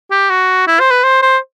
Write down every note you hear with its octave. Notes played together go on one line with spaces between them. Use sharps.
G4
F#4
E4
C5
B4
C5
C5